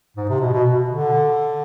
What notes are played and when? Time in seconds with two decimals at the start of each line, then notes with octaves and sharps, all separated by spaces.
0.17 G#2
0.29 C3
0.41 B2
0.53 B2
0.91 D3